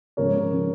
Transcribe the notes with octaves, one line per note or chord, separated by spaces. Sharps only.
G#2 F3 G#3 C#4 A#4 C#5
F3 G#3 C#4